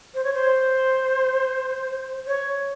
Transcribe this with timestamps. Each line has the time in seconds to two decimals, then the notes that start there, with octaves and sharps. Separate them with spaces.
0.15 C5
0.24 C#5
0.34 C5
2.27 C#5